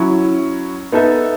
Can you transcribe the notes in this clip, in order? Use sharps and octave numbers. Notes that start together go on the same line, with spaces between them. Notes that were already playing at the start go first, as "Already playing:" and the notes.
Already playing: F#3 C#4 E4
B3 D#4 A4 E5